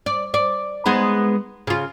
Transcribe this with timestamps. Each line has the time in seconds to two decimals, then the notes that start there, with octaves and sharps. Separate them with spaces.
0.06 D5
0.34 D5
0.86 G#3 B3 D#4
1.67 C#3 F4